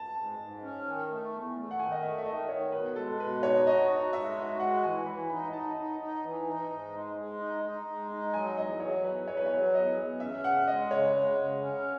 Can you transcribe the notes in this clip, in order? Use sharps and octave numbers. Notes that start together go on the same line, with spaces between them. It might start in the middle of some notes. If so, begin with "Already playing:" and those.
Already playing: A5
G#2
G#2
C#4
D#3
A3
E2
A3
F#5
D#3 G#5
D#5
A3 E5
E5
D#3 D#5
D#3 C#5
B2 B4
G#3 A4
B2 B4
D#4 C#5
F#4 D#5
D#4
G#3 E5
F#4
G#3 F#5
E3 G#5
E3 B5
D#4 B5
D#4 A5
D#4
D#4
E3
D#4
G#2
G#3
G#3
D#4
D#4
G#3
D#4
F#3 G#5
E2 D#5
F#3 C#5
E2 B4
E2 C#5
B4
F#3 C#5
E2 D#5
E2
C#4 E5
C#3 F#5
G#3 D#5
C#3 C#5
G#3
C#3
C#4